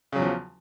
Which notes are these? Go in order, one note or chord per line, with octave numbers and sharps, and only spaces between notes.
E2 C#3 F3 F#3